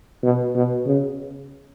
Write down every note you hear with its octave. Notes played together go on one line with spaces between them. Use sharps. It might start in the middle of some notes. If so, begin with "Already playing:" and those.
B2
B2
C#3